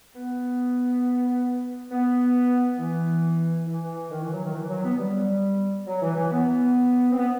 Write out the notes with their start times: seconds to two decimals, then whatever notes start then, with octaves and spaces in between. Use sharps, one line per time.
0.16 B3
1.91 B3
2.79 E3
3.67 E3
4.11 D#3
4.22 E3
4.33 F#3
4.44 D#3
4.55 E3
4.70 F#3
4.84 B3
4.99 G3
5.87 F#3
6.02 E3
6.16 E3
6.31 B3
7.12 C4
7.19 B3